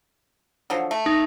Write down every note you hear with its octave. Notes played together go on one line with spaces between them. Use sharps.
D3 F3 F#3
A3
D#4